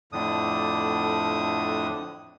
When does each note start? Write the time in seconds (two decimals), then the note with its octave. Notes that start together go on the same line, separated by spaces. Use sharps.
0.13 F2 A2 D3 D4 D#6